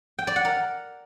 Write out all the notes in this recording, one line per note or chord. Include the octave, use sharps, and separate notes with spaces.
G5
D5
F#5
A#4